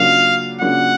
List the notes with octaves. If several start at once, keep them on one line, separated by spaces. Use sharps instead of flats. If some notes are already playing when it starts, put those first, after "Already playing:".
Already playing: C#3 F#3 A#3 D4 F4 F5
C#3 F#3 A#3 D4 F4 F#5